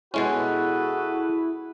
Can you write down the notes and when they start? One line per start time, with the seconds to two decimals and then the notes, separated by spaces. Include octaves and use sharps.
0.14 B2 G#3 C#4 E4 F#4 G#4 A4 B4